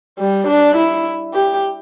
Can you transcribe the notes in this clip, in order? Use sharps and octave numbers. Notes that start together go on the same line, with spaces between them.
G3
D4
E4
G4